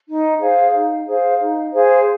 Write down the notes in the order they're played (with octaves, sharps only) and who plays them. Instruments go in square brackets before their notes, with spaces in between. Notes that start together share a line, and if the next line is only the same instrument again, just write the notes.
[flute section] D#4
G#4 C5 F5
D#4
G#4 C5 F5
D#4
G#4 C5 F5